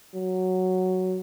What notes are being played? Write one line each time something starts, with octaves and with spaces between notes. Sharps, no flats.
F#3